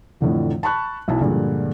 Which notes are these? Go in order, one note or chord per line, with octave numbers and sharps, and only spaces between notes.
F2 A2 D3 E3
A5 B5 C#6 F#6
B1 E4 A5
G2 A#2 D3 F3 G#3